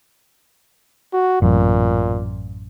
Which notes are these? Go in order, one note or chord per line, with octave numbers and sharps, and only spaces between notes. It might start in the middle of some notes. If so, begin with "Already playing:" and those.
F#4
A1 F#2 A#2